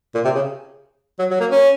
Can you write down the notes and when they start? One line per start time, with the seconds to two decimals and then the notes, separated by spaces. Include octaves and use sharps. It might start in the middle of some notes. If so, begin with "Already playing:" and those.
0.15 A#2
0.25 C3
0.35 C#3
1.19 F#3
1.31 F#3
1.40 A#3
1.51 C#4